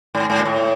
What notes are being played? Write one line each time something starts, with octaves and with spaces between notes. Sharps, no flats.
G#2
G#2
A#2
A2